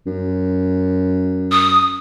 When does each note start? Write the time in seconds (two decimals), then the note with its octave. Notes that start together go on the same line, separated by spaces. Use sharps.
0.07 F#2
1.52 D#6